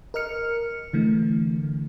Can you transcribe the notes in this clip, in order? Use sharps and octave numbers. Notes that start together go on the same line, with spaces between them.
A#4 D#5 F6 C#7
D3 E3 A3